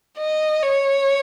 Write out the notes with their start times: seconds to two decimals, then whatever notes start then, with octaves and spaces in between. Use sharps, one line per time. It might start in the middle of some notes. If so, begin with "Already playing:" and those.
0.19 D#5
0.62 C#5